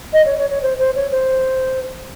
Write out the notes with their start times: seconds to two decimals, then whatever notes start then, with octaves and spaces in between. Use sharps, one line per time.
0.13 D#5
0.26 C#5
0.38 C#5
0.50 C#5
0.63 C5
0.79 C5
0.96 C#5
1.12 C5